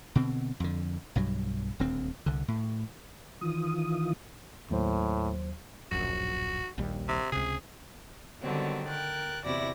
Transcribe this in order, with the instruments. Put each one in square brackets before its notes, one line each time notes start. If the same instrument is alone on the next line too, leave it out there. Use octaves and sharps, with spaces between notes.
[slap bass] B2 D3 C4
F2 D3
B1 G2 F#3
D#1 D2 C4
C2 D3
A2
[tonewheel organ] D#3 E3 F4 D#6
[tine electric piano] D#2 F#3 C5 [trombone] A2
[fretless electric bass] D1 A#1 F#2 [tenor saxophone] F#4
[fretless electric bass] A#1 D#2 G3
[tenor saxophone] C3
[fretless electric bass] C#2 C3 [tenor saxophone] G#4
[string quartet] D3 D#3 F#3 G3 B3 C4
A#4 G5 F#6 A6
E2 C3 E4 F#4 D5 A#6